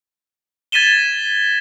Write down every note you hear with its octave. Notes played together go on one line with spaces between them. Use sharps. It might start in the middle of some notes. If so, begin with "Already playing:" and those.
G#6 A6 B6 D#7 E7 G7